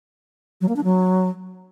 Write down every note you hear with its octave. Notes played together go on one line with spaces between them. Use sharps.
F#3
A#3
D4
F#3